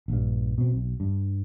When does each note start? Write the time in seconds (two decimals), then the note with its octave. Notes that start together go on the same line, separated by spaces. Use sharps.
0.08 A#1 G2
0.58 B2 C4
0.73 B1
1.00 G2